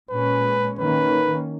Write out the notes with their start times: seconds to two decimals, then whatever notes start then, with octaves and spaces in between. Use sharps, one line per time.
0.10 A#2 G#3 C#4 B4
0.79 D#3 A#3 C#4 B4